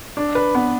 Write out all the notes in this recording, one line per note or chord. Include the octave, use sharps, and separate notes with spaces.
D4
B4
B3